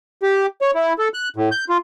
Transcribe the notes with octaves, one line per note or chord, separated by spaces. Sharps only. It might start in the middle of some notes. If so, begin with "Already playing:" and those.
G4
C#5
E4
A4
F#6
A2
G6
F4